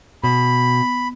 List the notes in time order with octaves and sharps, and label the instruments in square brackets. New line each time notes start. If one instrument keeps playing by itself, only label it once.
[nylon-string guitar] B2 [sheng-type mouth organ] B5